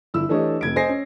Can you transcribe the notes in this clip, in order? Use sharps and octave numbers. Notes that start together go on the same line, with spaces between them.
G1 E4 E6
E3 A3 D4 G4 C#5 D#5
F1 G#6 D7
C5 D#5 G#5 A#6 C7
C#4